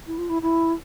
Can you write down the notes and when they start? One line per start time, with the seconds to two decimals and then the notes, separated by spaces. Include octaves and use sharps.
0.07 E4
0.18 F4
0.29 E4
0.42 E4